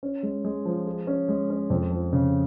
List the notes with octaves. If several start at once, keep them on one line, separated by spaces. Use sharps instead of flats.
C#4
G#3
G#3
F3
G#4
C#4
G#3
C#4
F2
F3
C#3